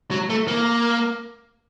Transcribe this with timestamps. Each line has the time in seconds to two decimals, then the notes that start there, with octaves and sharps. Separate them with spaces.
0.11 F#3
0.30 A3
0.48 A#3